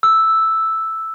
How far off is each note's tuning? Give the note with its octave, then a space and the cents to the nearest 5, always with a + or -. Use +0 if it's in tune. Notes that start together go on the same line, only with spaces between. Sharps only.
E6 +0